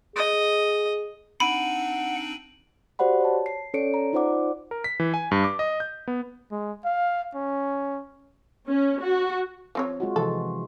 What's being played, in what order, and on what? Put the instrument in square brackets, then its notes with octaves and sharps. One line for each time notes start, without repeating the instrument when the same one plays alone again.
[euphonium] G#4 [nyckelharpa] D#5
[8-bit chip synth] C4 D4 D#4 [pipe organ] F#5 [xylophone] B5 [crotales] D7 D#7 F#7
[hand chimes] F#4 G4 C5 D5 F#5 B5
C#5 A5
C7
C#4 A4 C#5 D5 C#7 D7
A#5
D#4 F4 C5 D5 F#5 D6
[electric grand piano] A#4
B6
E3
G#5
G2
D6
D#5
G6
B3
[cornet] G#3
F5
C#4
[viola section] C#4
F#4
[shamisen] F3 C4 C#5
[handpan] G#3 F4 F#4
[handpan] C3 E3 F3 [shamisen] A4